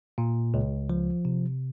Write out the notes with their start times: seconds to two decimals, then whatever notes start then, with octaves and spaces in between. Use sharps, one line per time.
0.18 A#2
0.54 C#2
0.90 F3
1.25 C3